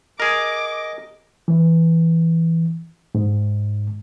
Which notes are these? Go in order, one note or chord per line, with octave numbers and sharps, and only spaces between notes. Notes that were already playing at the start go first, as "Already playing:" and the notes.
G#4 A#4 D#5 D6
E3
G#2